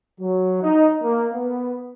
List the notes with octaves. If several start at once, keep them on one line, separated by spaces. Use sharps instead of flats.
F#3
D#4
A#3
B3